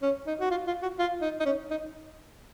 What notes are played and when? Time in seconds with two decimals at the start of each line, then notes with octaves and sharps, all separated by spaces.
0.02 C#4
0.27 D#4
0.40 F#4
0.50 F4
0.67 F4
0.82 F#4
0.99 F4
1.22 D#4
1.40 D#4
1.45 C#4
1.70 D#4